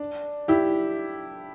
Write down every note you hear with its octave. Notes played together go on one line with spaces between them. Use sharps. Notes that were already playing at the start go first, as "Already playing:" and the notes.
Already playing: D4
E4 G4